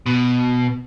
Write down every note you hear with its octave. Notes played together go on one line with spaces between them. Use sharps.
B2